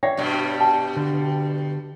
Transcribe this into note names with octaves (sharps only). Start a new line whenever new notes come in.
C#5 D5 E5 F#5 G5 A#6
G2 B2 G3
G5 A5
D3